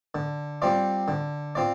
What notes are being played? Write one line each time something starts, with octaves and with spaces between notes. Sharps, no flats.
D3
G3 C4 F4 D5
D3
C4 F4 D5